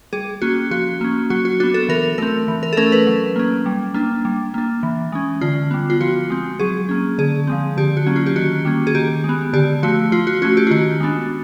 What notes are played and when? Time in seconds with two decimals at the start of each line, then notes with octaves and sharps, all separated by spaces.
0.13 G3 G#4
0.42 A#3 C#4 F#4
0.71 F3 F#4
1.01 A#3 C#4
1.30 F#3 F#4
1.45 F#4
1.60 D4 F#4
1.63 B3
1.74 A4
1.89 E3 A#4
2.18 A3 C4 A#4
2.48 E3
2.63 A#4
2.73 A4
2.77 A3 C#4 A#4
2.92 B4
3.07 F#3
3.36 A#3 C#4
3.66 G3
3.94 A#3 D4
4.25 G3
4.54 A#3 D4
4.83 E3
5.12 G#3 C#4
5.41 D3 F4
5.71 G3 B3
5.90 F4
6.01 F3 F#4
6.30 G#3 C4
6.59 F#3 G#4
6.89 A#3 C#4
7.18 D3 G#4
7.47 F3 G#3 C4
7.77 D3 G4
7.97 F#4
8.06 F#3 A#3 C#4
8.16 F4
8.26 G4
8.36 D#3 F#4
8.65 G3 A#3 C#4
8.87 G#4
8.95 D#3 G4
9.24 G#3 B3
9.53 D3 G4
9.83 F3 A3 F#4
10.12 F3 F4
10.27 F#4
10.42 A3 C#4 F#4
10.57 G4
10.67 F4
10.71 D#3 F#4
11.00 G#3 B3 D4